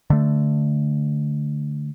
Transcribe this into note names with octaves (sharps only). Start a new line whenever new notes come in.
D3 A3